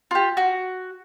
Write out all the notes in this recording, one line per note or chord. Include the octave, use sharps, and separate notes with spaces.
F4 G4
F#4